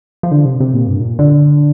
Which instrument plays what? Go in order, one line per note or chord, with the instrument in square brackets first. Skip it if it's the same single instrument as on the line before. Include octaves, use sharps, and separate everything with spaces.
[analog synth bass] F3
D3
C3
C3
A#2
G2
A#2
D3